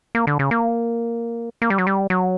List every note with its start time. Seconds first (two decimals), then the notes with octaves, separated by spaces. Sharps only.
0.15 A#3
0.27 D3
0.39 C#3
0.51 A#3
1.62 A#3
1.70 G3
1.78 F#3
1.87 G3
2.10 F#3